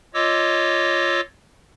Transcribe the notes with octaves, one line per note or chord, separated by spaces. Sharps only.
F4 C#5 D#5 D6 E6